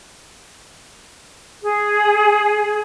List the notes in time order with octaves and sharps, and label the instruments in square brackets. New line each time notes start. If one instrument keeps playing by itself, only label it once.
[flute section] G#4